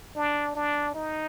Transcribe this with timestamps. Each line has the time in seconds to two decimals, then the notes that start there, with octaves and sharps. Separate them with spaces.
0.16 D4
0.55 D4
0.94 D#4